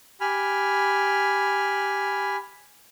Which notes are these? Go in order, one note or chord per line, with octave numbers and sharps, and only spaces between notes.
G4 G#5 B5 F6